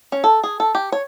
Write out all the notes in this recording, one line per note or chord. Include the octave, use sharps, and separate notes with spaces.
C#4
A4
G#4
A4
G4
C#5